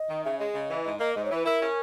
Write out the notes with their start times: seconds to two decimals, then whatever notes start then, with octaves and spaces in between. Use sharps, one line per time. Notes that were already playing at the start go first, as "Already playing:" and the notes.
Already playing: D#5
0.08 D#3
0.24 C#3 E5
0.39 G#3 D#5
0.54 C#3
0.70 E3
0.85 G#2 D#5
1.00 A#3 D#5
1.15 G#2 D#5
1.25 C#5
1.31 E3 B4
1.46 E4 A#4
1.61 C#4